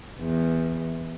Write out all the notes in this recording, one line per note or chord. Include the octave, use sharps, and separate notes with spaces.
E2